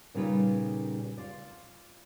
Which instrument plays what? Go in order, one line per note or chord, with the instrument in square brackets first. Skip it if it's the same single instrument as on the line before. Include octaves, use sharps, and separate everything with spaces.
[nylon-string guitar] A#2 C#3 G3 D#4 F4 B4
F4 D5